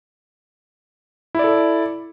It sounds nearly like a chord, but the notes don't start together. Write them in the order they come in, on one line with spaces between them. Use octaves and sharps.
E4 D5 A4